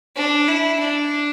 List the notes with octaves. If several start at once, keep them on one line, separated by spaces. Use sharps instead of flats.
D4
E4
D4